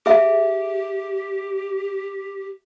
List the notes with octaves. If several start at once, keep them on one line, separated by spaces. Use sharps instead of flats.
G4 G#4 E5